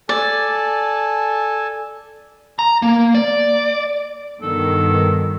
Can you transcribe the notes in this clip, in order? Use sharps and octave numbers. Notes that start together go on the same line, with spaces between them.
A4 D5 G#5 A5
A#5
A#3
D5
G2 B2 D#3 A4